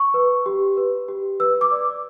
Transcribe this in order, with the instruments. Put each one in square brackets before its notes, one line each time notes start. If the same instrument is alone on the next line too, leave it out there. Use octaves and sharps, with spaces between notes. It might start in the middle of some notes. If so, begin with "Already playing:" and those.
Already playing: [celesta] C#6
B4
G4
B4
G4
B4 E6
D6
D5